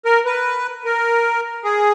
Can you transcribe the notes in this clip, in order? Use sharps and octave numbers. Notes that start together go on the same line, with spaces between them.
A#4
B4
A#4
G#4